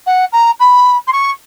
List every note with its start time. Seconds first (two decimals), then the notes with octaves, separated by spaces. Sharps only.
0.06 F#5
0.32 A#5
0.59 B5
1.07 C6
1.12 C#6